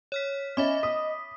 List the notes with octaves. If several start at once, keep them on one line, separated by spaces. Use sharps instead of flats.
C#5 F6 B6
C#4 D#5 E5 B5 D6
D#6 B6